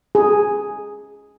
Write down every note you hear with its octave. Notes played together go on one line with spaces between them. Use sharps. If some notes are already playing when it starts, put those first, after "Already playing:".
G#4